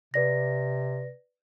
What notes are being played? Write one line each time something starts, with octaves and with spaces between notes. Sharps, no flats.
C3 B4 D5 A#6